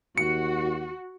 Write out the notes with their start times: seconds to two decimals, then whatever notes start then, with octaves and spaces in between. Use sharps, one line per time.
0.18 D#2 F#4 C#7